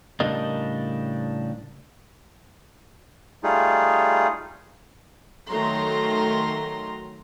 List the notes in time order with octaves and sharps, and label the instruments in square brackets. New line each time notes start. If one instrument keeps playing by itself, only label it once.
[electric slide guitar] A2 C#3 G3 D4 A#4 D#5
[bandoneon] G3 A3 D#4 F4 G#4
[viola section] D#3 F#3 A3 A#5 C6